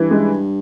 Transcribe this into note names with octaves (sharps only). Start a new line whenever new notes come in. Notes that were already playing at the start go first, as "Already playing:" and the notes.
Already playing: G2 E3
G#3